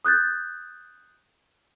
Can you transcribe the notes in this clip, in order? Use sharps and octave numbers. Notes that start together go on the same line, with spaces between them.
D#6 F#6 G6 A6